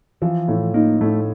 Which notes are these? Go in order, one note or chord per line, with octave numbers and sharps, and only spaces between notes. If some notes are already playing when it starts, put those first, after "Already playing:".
E3 F3
A2
A#3 D#4
A2 A3